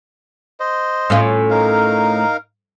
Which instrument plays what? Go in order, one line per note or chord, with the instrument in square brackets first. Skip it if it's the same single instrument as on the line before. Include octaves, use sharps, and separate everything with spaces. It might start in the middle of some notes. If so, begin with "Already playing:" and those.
[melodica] C5 D#5
[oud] A2 C#4 F4
[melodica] D#4 A#4 F5